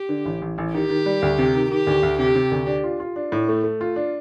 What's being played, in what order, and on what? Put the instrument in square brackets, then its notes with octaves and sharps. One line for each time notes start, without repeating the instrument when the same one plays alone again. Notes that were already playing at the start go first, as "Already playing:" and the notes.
Already playing: [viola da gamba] G4
[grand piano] D3
A1
A1
A1
[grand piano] D#3 [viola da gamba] G4
[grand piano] D#3
G3
D2
C3
D#3
[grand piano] D#3 [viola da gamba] G4
[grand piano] D2
D2
[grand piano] C3 [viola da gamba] G4
[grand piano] C3
D2
D4
F4
F4
D4
A2
A3
A3
F4
D4